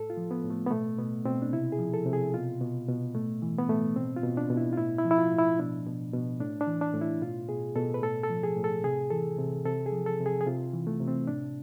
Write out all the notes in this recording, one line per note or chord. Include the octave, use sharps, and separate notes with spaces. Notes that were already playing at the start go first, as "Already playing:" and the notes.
Already playing: A2 A4
F4
F3
B3
A2
A3
B3
B2 A3
B2 B3
B2 C4
D4
C3 E4
G#4
F3
A4
C3
G#4
B2 F4
B2
B2
A2 A3
E3
B3
A2 A3
B2 C4
F4
B2
D4
B2
E4
F4
A2 E4
E4
F3
E4
F4
A2
E4
B2 D4
B2
B2
A2 D4
D4
E3
D4
A2
E4
B2 F4
B2 G#4
B2 A4
B4
A2 A4
A4
F3
G#4
A2
A4
C3 G#4
E3 A4
C3
C3 A4
G#4
F3
A4
C3
G#4
G#4
C3 F4
E3
A3
C3
C4
A2 D4